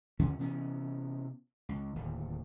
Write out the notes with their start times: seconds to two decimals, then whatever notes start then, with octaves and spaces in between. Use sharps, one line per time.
0.19 D#2 D3 C#4
0.39 C3 E3 B3 C#4
1.69 C#2
1.95 D1 D#2